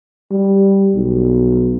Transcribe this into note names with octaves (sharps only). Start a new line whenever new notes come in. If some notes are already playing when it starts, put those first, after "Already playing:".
G3
B1